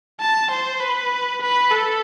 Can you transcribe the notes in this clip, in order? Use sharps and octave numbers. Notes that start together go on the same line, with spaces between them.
A5
C5
B4
B4
A4